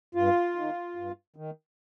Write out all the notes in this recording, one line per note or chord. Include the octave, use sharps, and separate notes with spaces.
G2 F4
D#3
G2
D#3